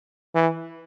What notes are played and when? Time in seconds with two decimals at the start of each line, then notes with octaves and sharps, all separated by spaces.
0.35 E3